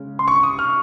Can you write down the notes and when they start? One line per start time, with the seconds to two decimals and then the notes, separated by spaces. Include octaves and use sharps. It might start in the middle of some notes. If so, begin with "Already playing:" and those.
Already playing: C#3 G#3 C#4
0.19 C6
0.28 C#6
0.43 D#6
0.59 F6